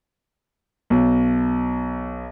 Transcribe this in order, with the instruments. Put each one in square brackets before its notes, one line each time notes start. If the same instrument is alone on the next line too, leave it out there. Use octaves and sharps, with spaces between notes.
[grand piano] B1